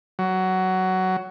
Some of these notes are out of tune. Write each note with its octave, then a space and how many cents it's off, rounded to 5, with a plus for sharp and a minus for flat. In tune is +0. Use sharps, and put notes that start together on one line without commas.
F#3 +15